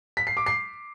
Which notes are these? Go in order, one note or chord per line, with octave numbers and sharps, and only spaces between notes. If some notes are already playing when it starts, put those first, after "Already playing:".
B6
C7
D6
C7